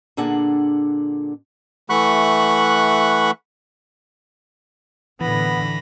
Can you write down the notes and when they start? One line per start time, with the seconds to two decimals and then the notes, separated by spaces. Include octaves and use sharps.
0.17 A#2 D3 D4 G#4 F#5
1.90 E3 A3 F#5 B5 C#6 F#6
5.21 A2 D3 E3 B3 B5 A#6